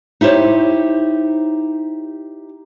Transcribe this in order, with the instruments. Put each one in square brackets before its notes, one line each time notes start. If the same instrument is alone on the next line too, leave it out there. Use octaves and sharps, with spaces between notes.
[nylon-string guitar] D#4 E4 G4 C5 C#5